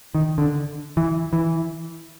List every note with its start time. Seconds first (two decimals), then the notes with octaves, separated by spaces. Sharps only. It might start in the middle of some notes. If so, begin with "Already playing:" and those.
0.15 D#3
0.38 D3
0.97 E3
1.33 E3